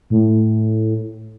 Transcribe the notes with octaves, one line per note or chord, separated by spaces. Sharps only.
A2